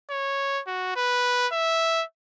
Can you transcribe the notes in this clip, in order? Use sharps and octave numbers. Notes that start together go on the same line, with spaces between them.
C#5
F#4
B4
E5